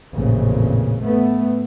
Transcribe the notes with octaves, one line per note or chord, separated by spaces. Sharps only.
A1 F2 A#2 C#3
A3 B3